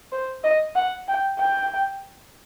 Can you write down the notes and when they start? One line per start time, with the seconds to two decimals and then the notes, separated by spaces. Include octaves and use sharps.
0.12 C5
0.44 D#5
0.76 F#5
1.08 G5
1.39 G5